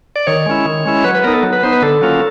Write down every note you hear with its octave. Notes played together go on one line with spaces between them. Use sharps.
D5
D#3 C#5
G#3 C#4 E4
D#3
G#3 C#4 E4
F#3 B4
B4
B3 D#4 A#4
A4
F#3
B4
B3 D#4 C5
B4
D3 A4
F#3 A#3 C#4 F4